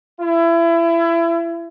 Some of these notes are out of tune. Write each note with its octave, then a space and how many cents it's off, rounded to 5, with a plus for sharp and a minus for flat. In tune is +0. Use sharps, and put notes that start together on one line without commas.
E4 +30